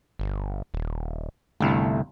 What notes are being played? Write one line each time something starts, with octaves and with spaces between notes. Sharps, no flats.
G1
D#1
G1 C2 A3